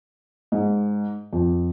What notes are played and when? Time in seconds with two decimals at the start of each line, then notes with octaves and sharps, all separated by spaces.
0.52 G#2
1.33 F2